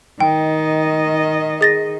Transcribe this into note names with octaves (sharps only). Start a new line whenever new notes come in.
D#3 D#5 G5
G#4 A6 A#6